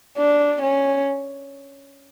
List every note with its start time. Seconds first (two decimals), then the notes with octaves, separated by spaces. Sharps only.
0.18 D4
0.62 C#4